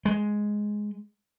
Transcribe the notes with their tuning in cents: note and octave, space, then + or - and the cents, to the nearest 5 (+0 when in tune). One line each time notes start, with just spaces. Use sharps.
G#3 +5